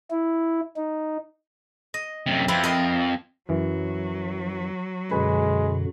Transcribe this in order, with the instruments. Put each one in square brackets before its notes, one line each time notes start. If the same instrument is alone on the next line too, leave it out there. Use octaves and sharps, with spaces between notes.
[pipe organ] E4
D#4
[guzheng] D#5
[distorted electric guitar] F#2 C3
[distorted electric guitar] F2 [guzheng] C4 E4 B4
[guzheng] A#4 D#5 C6
[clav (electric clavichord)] F#2 E3 [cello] F#3
[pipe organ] F#2 B2 D3 [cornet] G#3 [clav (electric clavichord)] B4 G#5